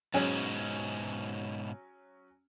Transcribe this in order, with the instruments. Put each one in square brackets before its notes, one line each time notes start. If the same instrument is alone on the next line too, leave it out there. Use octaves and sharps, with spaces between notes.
[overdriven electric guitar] G#2 B2 [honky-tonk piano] F#3 C#4 G#4